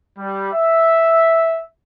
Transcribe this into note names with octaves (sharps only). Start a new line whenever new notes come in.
G3
E5